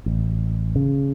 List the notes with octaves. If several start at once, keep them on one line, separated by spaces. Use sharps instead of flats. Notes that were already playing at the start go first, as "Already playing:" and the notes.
A1
C#3